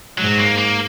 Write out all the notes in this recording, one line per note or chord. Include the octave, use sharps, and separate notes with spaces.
G#2 F#3
A#3
A#3